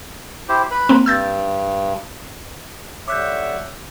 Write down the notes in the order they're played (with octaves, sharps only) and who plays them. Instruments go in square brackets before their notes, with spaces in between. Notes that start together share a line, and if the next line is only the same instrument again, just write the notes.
[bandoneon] E4 G4 C5
B4 B5
[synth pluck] A#3 C4
[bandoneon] G2 [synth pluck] E6 G6 A6
[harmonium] D3 G3 [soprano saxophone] C#5 [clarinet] E5 [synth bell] D6 F#6 G6